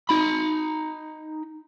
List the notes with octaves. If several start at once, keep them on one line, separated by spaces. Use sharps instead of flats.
D#4 B5